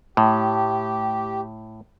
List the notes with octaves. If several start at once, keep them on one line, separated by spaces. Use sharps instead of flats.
A2 G4